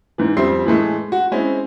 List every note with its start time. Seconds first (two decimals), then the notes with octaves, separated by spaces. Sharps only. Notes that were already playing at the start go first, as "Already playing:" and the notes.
0.18 G#2 E3
0.37 F2 G3 C4 E5 C6 C7
0.65 A2 E3 G#3 A3
1.12 F#4
1.32 G#3 C4 C#4 E4